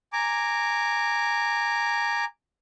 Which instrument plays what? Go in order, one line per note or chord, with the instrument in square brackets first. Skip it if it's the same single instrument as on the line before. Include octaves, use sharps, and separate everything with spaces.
[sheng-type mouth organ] G#5 A#5 D6